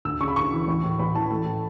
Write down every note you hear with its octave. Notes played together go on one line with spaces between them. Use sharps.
D2 E6
C#3 C#6
B5
D2 C#6
E3
A1
A2
A1 B5
E3 A5
A3
A2